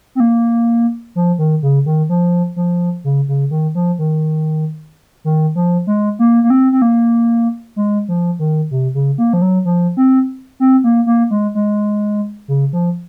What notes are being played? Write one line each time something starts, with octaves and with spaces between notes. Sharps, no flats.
C4
A#3
F3
D#3
C#3
D#3
F3
F3
C#3
C#3
D#3
F3
D#3
D#3
F3
G#3
A#3
A#3
C4
C4
A#3
G#3
F3
D#3
C3
C#3
A#3
F3
F#3
F3
C4
C4
A#3
A#3
G#3
G#3
C#3
F3